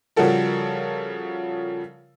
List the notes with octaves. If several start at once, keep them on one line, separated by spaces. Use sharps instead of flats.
C#3 F3 G3 F#4 A4 A#4